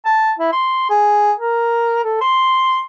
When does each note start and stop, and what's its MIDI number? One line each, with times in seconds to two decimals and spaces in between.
0.05 0.32 81
0.39 0.51 64
0.52 0.88 84
0.90 1.32 68
1.39 2.03 70
2.04 2.20 69
2.21 2.82 84